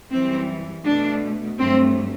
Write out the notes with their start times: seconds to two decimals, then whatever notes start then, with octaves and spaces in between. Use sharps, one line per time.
0.11 F#2 E3 G3 C4
0.85 B2 A3 D4
1.59 G2 F#3 A3 C4